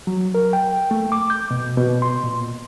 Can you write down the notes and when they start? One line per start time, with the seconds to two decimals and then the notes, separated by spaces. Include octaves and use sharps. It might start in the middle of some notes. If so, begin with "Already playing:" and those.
0.07 F#3
0.35 A#4
0.53 G5
0.91 A3
1.12 D6
1.30 G6
1.51 B2
1.77 B2
2.02 C6
2.24 A#2